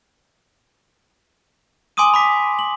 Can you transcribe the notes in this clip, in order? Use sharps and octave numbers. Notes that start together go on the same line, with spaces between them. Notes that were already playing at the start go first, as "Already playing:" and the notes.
G#5 C6 D6 D#6 D#7
B5 D6 B6
F#7